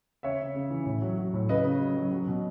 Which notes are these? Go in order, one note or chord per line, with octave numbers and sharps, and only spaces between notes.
C#3 C#5 E5
C#3
C#3
E3
A2
F#3
F#3
A2
C#3 B4 D#5
C#3
F#3
F#3
F#3
B2